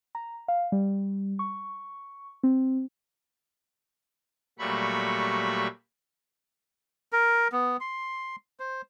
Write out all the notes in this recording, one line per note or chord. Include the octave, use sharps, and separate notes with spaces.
A#5
F5
G3
C#6
C4
A#2 F#3 G3 A3 B5 C#6
A#4
B3
C6
C5